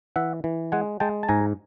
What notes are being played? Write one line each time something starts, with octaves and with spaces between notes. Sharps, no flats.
E3 E5 F#5
E3
G#3 F#5 G#5
G#3 G5 A5
A5
G#2 G#5 A#5